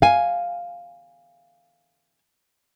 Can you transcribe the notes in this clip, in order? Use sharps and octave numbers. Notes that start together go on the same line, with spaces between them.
F5 G#5